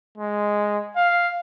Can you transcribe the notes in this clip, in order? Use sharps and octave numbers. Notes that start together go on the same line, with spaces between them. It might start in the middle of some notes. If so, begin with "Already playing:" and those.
G#3
F5